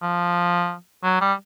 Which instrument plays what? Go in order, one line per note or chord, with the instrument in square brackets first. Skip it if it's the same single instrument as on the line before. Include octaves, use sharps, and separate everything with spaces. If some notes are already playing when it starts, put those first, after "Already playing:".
[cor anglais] F3
F#3
G3